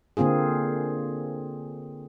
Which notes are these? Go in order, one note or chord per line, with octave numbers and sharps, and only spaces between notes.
D3 A#3 C4 F4 G#4